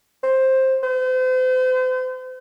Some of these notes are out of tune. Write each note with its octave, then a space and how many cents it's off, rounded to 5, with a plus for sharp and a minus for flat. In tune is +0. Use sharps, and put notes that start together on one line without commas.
C5 +10
C5 -40